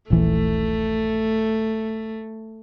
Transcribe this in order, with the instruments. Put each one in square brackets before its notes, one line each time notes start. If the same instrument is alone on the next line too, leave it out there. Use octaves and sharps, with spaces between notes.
[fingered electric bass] D#1 A#1 E3 [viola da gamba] A3